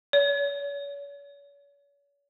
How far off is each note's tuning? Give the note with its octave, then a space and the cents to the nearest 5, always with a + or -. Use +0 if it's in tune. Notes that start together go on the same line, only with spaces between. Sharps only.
C#5 +40